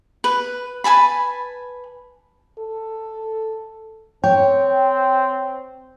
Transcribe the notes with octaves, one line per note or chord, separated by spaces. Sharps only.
B4
B4 G#5 A5 B5
A4
C4 C#5 G5